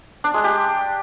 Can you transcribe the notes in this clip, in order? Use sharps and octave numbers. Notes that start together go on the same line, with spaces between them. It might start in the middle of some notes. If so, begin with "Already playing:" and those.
D4
G#3
G4